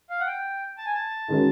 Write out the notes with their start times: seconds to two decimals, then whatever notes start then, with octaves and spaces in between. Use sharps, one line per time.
0.10 F5
0.20 F#5
0.27 G5
0.78 A5
0.86 G#5
0.94 A5
1.28 D#3 G#3 C#4 F#4 A#4